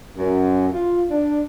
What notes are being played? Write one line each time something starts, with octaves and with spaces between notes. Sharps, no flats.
F#2
F4
D4